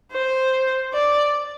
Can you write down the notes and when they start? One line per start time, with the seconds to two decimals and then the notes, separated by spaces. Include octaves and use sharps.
0.12 C5
0.94 D5